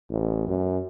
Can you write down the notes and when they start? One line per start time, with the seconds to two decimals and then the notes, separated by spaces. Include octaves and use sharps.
0.10 A1
0.47 F#2